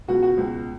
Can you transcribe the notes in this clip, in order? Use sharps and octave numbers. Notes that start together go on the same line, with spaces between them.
C#2 B2 F#4
F#4
C#2 B2